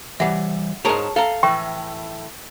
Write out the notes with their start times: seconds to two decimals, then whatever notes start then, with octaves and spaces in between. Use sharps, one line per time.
0.20 E3 G3 E5 F#5
0.85 G#2 G#4 A#4 C#5 A5
1.16 A4 F5 A#5
1.43 A2 E3 G5 C#6